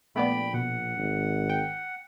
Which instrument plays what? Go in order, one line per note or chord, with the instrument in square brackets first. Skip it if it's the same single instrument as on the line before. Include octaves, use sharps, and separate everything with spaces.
[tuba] A#1 [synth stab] A3 B3 D5 [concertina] G5 B5
[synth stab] B2 [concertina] F#5
[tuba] G#1
[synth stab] G5